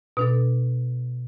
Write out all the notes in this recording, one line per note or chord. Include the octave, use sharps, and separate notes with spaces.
B2 D4 A4